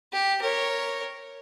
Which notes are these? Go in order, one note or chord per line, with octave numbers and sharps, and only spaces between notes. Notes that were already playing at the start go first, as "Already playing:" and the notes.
G4
A#4 C#5